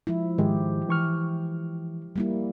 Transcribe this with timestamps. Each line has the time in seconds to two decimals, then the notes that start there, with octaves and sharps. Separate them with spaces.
0.07 F3 G#3 E4
0.38 G#2 D#3 G#3 G4
0.89 E3 C#6 F6
2.16 G3 A#3 E4